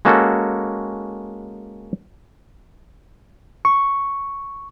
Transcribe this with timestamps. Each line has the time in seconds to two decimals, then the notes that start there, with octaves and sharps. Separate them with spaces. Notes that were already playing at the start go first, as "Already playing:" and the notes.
0.05 G#3 A#3 C#4 F#4 A4
3.65 C#6